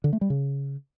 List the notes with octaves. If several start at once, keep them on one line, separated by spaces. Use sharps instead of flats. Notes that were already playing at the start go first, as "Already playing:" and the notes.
D3
A3
G3
C#3